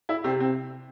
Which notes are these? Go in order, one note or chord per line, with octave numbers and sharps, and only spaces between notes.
E4
C3 C4
C4